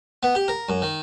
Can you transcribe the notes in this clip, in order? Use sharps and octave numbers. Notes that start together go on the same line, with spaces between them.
B3
G4
A#4
F#2
D#3